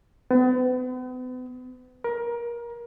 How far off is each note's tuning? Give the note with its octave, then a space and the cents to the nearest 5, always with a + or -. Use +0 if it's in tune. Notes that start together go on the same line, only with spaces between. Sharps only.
B3 +40
A#4 +25